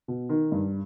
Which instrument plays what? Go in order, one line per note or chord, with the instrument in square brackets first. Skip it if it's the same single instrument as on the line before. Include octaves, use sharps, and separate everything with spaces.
[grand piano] B2
D#3
G2